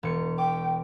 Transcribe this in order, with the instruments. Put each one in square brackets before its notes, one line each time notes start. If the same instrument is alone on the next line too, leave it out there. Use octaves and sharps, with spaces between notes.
[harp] E1 C#7
[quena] G5 [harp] D6